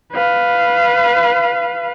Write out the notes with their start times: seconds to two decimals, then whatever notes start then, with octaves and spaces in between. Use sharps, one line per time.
0.13 B4 F5